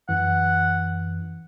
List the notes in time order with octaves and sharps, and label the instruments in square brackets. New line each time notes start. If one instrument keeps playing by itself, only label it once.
[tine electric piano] F#2 E3 [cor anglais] F#5